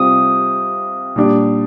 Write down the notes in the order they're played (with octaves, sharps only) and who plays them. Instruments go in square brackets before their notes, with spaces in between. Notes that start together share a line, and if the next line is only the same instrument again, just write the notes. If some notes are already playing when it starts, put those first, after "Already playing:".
Already playing: [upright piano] C3 G3 C4 F4 [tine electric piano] D#6
[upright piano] A#2 G3 D4